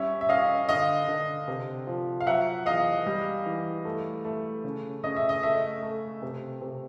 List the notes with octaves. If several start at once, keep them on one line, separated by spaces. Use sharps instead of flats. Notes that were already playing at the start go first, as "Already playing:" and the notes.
Already playing: G3 C#4 E5
E5
C#4 D#5 F5
D3 D#5 F5
D3
C3
F3
F5
F#3 E5 F#5
E2 D#5 F5
G3
E3
A3
A3
C#3
C#3 D#5
E5
D#5
A3 E5
A3
C3
C3